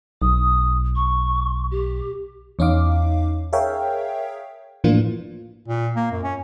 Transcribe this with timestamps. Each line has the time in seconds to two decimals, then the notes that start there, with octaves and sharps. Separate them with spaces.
0.22 B1 D#6
0.96 C#6
1.71 G4
2.59 E2 C#4 D#4 F5 D6
3.53 G#4 A#4 C#5 E5 F5 G5
4.84 A2 E3 F3 A#3 D4 F4
5.68 A#2
5.96 A#3
6.11 F#2
6.24 C#4